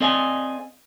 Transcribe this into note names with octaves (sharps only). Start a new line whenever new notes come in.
C4 A4 D5 D#5 F5 G#5